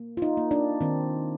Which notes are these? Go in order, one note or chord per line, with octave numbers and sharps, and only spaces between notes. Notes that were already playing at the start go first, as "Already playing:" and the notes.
Already playing: A#3
F4
D#4
A#3
D4
D#3 C4